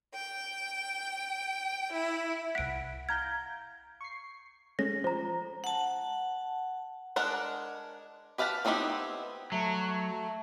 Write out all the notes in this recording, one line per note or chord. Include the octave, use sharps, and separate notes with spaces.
G5
E4
C2 F#5 B6 D7
F5 A#5 G6 G#6
C#6 C7
G#3 A3 C#4 A#6
F3 C5 A#5
F#5 A5
G#3 D4 A#4 F#5
G4 B4 F5 F#5 A5
B3 C4 D#4 E4 G4
F#3 A3